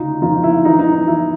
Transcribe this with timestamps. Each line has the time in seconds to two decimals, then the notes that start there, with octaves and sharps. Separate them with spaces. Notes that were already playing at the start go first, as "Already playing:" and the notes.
Already playing: D2 C#3 D#4 F4
0.22 F2 D#4 F4
0.43 E4
0.65 E3 D#4
0.79 D#4
1.08 E3 E4